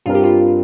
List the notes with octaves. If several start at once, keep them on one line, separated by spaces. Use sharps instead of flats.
G2 G3 C4 F4 A#4
G4
F4